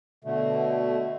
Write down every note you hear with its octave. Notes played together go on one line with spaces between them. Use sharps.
B2 D3 A3